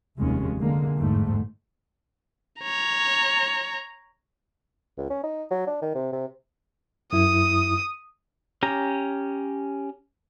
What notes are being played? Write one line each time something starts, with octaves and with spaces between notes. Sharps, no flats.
F1 D#2 G#3 C#4
D3 G#3 A#3
G1 E2 G#2 A3
C#5 A#5
C#2
C#4
D#4
F#3
D4
D#3
C3
C3
F#2 E4 D#6
C#4 G4 A#5